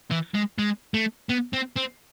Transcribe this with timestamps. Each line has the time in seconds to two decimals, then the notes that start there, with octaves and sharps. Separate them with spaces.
0.11 E3
0.35 G#3
0.59 G#3
0.94 A3
1.29 B3
1.53 C4
1.76 C4